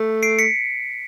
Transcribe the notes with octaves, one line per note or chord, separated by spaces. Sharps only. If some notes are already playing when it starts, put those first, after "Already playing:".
Already playing: A3
C7 D7
B6 C#7